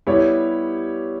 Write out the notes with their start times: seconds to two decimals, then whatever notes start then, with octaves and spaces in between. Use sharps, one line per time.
0.07 G3 B3 E4 G4 C#5